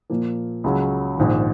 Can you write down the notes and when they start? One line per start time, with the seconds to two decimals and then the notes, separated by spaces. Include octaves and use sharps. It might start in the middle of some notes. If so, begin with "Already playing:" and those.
0.10 A#2 F3 A#3
0.64 C#2 C#3 F#3 C#4
1.17 A#1 G#2 D#3